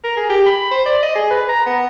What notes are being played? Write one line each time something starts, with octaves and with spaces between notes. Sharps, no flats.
A#4
G#4
G4
B5
C5
D5
D#5
G#4
B4
A#5
B3